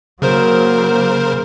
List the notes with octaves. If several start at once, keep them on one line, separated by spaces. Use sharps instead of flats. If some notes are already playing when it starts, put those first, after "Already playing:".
C#3 F#3 A#3 A#4 C5